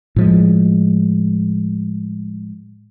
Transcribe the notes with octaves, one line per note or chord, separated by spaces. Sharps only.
A2 F3 G#3